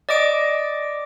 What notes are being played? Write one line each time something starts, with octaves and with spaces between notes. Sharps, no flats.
D5 D#5 D6 D7